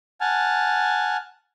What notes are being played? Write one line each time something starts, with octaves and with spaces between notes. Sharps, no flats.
F#5 G#5 A5 F6